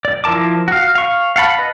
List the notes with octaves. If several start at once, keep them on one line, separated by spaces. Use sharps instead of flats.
D5
F3 E4 A#4 A5 D6
F#4 F5
F5 C#6
F5 F#5 A5 B5
B4 D#5